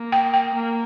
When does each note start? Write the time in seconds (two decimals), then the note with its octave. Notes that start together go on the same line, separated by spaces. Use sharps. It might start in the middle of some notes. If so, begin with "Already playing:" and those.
Already playing: A#3
0.12 G5
0.34 G5
0.55 A#3